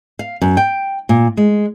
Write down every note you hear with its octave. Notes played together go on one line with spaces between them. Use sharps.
F5
F#2
G5
A#2
G#3